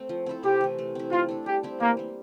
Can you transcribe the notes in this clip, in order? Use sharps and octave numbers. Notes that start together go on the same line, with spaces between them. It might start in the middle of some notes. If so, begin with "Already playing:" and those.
Already playing: A3 C4
F3
C4 E4 A4
C3 G4
E3 A3
A3
C4 E4
A3 F4
D4 A4
G3 G4
C4 E4 G4
E3 A#3
G3 A#3